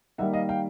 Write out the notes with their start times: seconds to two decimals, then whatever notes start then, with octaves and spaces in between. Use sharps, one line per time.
0.18 D#3 G3 A#3 E5 F#5
0.33 D#5 F5
0.49 F5 G5